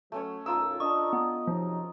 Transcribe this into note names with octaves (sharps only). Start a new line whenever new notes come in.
F#3 A3 C#4 C#5
B1 F#2 F4 A#4 E6
D4 D#5 C#6
B3
C3 F3 F#3 D#4